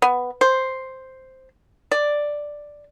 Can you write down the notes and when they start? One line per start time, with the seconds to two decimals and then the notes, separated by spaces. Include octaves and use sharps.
0.02 B3
0.41 C5
1.91 D5